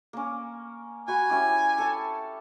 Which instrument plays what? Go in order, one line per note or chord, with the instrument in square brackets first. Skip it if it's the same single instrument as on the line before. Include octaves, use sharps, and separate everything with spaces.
[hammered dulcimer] A#3 C#4
[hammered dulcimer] F#4 B5 [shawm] G#5
[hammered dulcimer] C#4 E4 G4
A4 C#5 A5